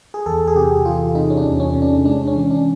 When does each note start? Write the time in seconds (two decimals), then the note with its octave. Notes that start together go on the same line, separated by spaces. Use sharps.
0.14 G#4
0.26 E2 A4
0.48 G#4
0.55 C3 G4
0.85 E3 F4
1.15 C3 D#4
1.30 C#4
1.37 D4
1.45 E2
1.60 C#4
1.75 C3
1.82 D4
2.05 G#3 D4
2.27 C#4
2.35 E3
2.50 D4